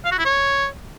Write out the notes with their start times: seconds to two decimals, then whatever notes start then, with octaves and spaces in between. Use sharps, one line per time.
0.05 F5
0.12 F#4
0.19 E4
0.25 C#5